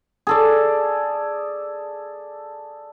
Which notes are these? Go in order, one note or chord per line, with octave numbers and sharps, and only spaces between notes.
G#4 A4 D5